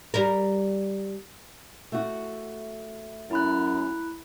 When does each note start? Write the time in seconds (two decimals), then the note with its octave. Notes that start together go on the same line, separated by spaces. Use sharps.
0.14 G3 A#4
1.92 A3 F#4
3.31 F#2 E4 B5 F#6